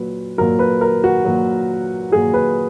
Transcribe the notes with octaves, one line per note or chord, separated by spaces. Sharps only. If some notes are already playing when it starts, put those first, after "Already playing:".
Already playing: A#2 F#3 B4
A#2 F#3 A#4
B4
A#4
F#4
A#2 F#3
A#2 F#3 G#4
B4